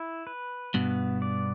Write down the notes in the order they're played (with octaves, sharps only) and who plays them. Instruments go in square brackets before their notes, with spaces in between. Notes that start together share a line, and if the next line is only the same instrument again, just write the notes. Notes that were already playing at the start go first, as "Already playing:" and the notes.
Already playing: [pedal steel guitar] E4
B4
[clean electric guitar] G2 B2 [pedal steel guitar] B3
[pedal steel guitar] D5